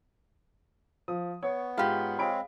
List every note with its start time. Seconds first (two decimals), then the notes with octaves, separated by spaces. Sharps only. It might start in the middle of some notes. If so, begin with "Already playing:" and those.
1.08 F3 D#6
1.43 B3 C#5 C#6
1.78 G#2 F4 G4 B5
2.19 G#3 C4 G#4 C#5 F5 B5 D7